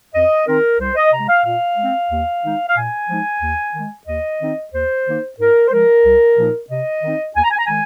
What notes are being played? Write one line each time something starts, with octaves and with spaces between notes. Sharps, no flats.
F2 D#5
D#3 C4 D#4 A#4
C2 C5
D#5
C3 G#3 A#5
F5
A#2 F5
G#3 C4
D#2
D#3 G#3 D#4
F5
A#2 G#5
F3 G#3 D#4
D#2
D#3 G#3
D#2 D#5
D#3 C4 D#4
D#2 C5
D#3 A#3 D#4
G#2 A#4
C5
F3 G#3 A#4
C2
A#2 F3 A#3 D#4
C3 D#5
D#3 C4 D#4
D#2 G#5
A#5
G#5
A#5
D#3 G#3 G#5